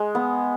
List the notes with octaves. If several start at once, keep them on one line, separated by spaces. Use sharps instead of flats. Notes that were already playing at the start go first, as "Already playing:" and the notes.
Already playing: G#3
B3